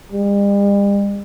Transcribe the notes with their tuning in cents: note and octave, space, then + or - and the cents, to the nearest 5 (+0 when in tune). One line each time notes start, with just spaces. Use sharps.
G3 +45